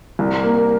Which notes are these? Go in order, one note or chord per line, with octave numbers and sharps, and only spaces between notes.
C2
A#3